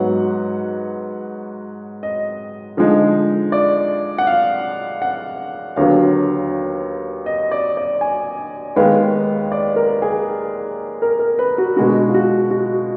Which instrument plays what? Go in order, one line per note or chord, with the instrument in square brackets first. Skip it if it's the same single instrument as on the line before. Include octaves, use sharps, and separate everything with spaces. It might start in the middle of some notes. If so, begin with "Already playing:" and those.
Already playing: [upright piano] G#2 F#3 B3 F#5
D#5
D3 F3 G#3 D#4
D5
F#5
F5
F#5
D#2 D3 F#3 B3 D4 F5
D#5
D5
D5
G#5
D#2 D#3 G#3 B3 F5
D5
A#4
G#4
A#4
A#4
B4
F#4
B2 G#3 D4 F#4
F4
F#4
F#4